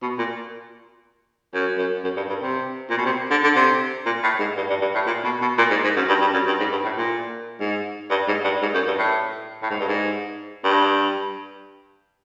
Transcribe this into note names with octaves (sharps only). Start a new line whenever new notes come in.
B2
A#2
F#2
F#2
F#2
G2
G2
C3
A#2
B2
C3
D3
D3
C3
A#2
A2
G#2
G2
G2
G2
A2
A#2
B2
B2
A#2
G#2
G#2
F#2
G2
G2
F#2
G2
G#2
G2
A2
A#2
G#2
G2
G#2
G2
G#2
F#2
G2
A2
A2
G#2
G2
G#2
G2